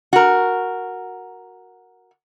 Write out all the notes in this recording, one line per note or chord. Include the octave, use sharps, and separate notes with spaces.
F#4 A#4